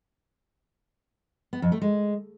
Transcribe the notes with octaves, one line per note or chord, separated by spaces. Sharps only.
B3
F2
A3
G#3